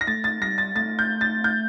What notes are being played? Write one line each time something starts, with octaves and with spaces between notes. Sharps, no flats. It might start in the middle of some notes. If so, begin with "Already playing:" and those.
A#6
A3 A6
A6
G3 A#6
A6
A3 A6
G6
A6
G6